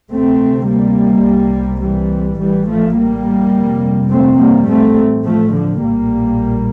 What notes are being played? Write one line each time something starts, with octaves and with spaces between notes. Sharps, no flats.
D2 C3 A3 C4
G3 A#3
C2 C3
E3 G3
A1 A2 E3 G3
F3 A3
G3 A#3
G1 F2 C3
A3 C4
G3 A#3
A1 A2 A3 C4
F3 A3
D3 F3
A#1 A2 G3 A#3